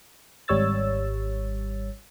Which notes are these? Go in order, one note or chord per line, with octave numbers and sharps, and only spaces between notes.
G#1 G3 C#5 E6 A6